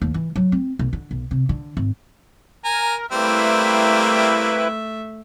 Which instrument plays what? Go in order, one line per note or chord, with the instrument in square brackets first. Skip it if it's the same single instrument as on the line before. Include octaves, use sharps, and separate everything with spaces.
[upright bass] D#2
E3
F#3
C4
B1
D3
B1
C3
D3
G#1
[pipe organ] A#4 [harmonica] G#5 A#5
[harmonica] G3 A#3 C4 [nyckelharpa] A3 E5 [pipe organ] E4 B4